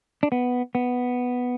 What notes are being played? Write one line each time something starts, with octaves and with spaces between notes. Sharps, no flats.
D4
B3
B3